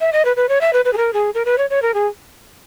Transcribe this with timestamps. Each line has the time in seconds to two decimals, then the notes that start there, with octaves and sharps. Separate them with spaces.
0.01 E5
0.13 D#5
0.25 B4
0.36 B4
0.49 C#5
0.61 E5
0.73 B4
0.85 B4
0.93 G#4
0.97 A#4
1.13 G#4
1.34 A#4
1.45 B4
1.58 C#5
1.70 C#5
1.82 A#4
1.94 G#4